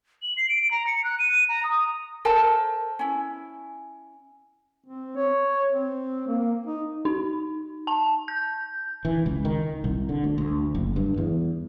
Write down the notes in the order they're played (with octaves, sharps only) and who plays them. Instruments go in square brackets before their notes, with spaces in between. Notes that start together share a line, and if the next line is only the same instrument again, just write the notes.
[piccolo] F#7
C7
D7
A#5
C#7
F#6
D#7
A#5
D#6
[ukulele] A4 A#4 C5 A5
C#4 E4
[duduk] C4
C#5
C4
A#3
D#4
[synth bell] D#4
A5
G6
[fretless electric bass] E3
C#2
D#3
C2
D3
D2
D2
F#1
G2
E2